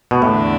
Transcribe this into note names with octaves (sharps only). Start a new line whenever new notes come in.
B2
E2 A2 D3 A3 D4